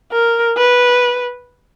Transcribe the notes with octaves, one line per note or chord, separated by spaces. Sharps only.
A#4
B4